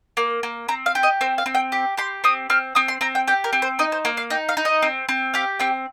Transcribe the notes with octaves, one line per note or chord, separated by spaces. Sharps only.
A#3
A#3
C4 A#5
F5
G4
D#5
C4 C5
F5
C4
G5
G4
G4 C6
C4 D#6
C4 F6
C4 D#6
C6
C4 A#5
G5
G4 G5
A#4
C4
C5
D#4 D#5
C5
A#3 C5
F5
D#4 G5
F5
D#4
D#5
C4
C4
G4 F5
C4 G5